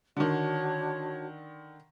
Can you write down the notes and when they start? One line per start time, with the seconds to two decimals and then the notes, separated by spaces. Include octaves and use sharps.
0.17 D3 D#3 D4 F#4 C#5